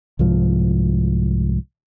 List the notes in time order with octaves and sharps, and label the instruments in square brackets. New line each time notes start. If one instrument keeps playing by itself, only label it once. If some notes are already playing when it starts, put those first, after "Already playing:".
[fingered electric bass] C2 G#2 F3